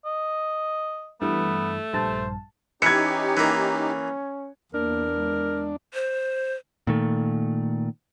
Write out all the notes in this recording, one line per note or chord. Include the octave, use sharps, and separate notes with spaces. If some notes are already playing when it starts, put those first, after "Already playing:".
D#5
G2 E3 A3 B3
A#1 G2 C5 A5
E3 C#4 D#4 G4 G#6 C#7
E3 A#3
E2 A#3 D4 A#4
G#3
C5
A#2 D#3 A3